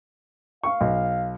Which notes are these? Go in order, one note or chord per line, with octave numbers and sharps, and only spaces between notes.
F5 C#6
B1